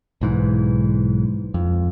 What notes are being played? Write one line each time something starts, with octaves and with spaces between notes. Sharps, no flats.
B1 G#2 E3
F2